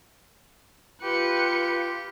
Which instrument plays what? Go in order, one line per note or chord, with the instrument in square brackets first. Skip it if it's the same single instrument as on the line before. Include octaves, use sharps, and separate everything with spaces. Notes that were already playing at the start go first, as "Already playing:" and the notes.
[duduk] F4 [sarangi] G4 [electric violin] B4 C#7